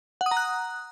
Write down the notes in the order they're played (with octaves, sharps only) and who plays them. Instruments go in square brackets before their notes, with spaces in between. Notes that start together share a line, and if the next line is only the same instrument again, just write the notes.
[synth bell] F#5
D#6
A#5
F#6